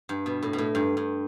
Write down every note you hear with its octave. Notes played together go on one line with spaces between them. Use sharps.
G2
B2
A2
B2
A2
G2
G2